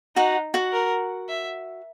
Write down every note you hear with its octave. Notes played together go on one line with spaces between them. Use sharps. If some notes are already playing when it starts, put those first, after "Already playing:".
D#4 F#4 F#5
F#4 F#5
A#4
E5